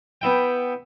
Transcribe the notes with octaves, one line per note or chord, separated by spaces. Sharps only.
B3 E4 G5